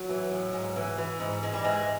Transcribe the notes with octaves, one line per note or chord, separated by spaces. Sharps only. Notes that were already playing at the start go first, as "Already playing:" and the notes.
Already playing: F#3
E3
A2
G#2
E3
E3
G#2
G#2 G#3
G3
E3 G#3